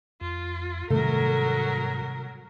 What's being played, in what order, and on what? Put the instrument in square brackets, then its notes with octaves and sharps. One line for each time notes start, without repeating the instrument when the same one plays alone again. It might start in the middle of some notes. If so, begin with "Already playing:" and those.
[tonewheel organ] F2 [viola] F4
[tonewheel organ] G#2 [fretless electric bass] C3 D#3 G3 [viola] F#3 A#4 [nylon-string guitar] A3